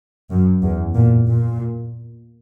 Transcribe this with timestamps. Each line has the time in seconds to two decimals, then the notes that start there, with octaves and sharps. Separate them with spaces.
0.30 F#2
0.62 E2
0.95 A#2
1.27 A#2